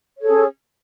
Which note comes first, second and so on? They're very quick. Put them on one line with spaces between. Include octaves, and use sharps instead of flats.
C#5 A4 G#4 C#4